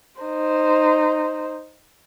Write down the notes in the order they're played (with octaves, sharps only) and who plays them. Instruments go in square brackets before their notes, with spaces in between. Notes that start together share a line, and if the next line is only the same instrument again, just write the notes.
[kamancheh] D#4 C5